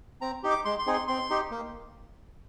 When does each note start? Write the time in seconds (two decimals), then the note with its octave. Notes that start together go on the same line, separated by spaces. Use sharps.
0.21 C4 A#5
0.43 D#4 G4
0.50 D6
0.65 G#3 C6
0.79 C6
0.87 C4 D#4 G#4
0.93 C6
1.08 C4 C6
1.30 D#4 G4
1.51 A#3